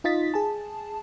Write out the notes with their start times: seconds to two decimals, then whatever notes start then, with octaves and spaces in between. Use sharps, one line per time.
0.04 D#4 F4 D#5 A6 B6
0.34 G#4 A5